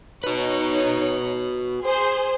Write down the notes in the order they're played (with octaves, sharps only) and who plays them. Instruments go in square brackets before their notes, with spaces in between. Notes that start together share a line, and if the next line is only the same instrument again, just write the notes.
[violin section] D#4 C#5 [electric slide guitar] F#4 B4
[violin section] G#4 C5